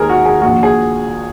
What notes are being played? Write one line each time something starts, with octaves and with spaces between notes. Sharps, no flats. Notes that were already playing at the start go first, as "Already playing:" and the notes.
Already playing: D#2 D#3 G#4 A#4
F#4
G#4
A#1 A#2 F#4
G#4